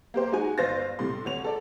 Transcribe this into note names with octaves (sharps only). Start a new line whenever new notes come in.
A#3 G4 C5
G#3 D#4 F#4 G#5
G1 C5 F5 A6 A#6
A2 C3 G3 C6
D2 C#5 F7
A4 D5